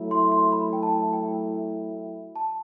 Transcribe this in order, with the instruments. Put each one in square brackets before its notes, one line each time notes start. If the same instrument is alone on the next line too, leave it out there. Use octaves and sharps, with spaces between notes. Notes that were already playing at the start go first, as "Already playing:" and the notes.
Already playing: [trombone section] F#3 A3 E4
[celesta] C6
C6
B5
G5
A5
G5
A5